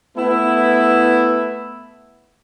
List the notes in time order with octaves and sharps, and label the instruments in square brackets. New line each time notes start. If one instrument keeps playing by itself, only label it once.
[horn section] A3 B3 E4